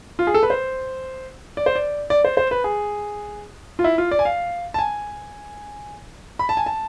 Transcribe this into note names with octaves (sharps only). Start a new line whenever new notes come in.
F4
G#4
A4
B4
C5
D5
C5
D5
D5
C5
C5
B4
G#4
F4
E4
F4
D5
G#5
F5
A5
G#5
B5
A5
G#5
A5